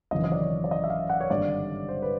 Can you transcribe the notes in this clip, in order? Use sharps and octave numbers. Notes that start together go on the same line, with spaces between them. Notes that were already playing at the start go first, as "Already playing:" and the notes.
G#1 F#2 C#3 E3 D#5
D#5
D5
C#5
D5
D#5
E5
F5
F#5
C#5
G#1 G2 D3 D5
C5
B4